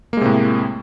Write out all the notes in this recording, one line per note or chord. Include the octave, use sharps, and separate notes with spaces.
A2 C3 G#3 A#3